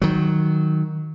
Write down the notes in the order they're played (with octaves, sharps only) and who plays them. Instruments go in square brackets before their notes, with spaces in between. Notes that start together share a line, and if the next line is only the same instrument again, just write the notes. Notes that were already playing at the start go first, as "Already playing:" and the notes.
[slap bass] D#3 F#3